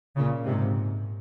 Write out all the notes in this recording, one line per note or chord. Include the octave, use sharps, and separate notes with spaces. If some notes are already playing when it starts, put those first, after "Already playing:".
A#2 C#3
G#2 C3